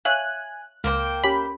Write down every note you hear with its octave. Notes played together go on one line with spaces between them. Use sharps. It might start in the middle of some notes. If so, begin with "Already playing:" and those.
C#5 E5 F5 G#5 F#6
C#2 A#3 C5 G5
C#4 G4 B5